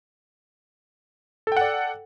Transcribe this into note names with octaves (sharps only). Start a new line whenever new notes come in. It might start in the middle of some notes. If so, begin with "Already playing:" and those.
A4 D5 F#5 G5